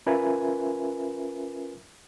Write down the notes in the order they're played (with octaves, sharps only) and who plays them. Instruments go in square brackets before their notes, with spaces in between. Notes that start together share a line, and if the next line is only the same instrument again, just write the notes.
[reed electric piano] C#4 F4 A#4 B4 E5 G#5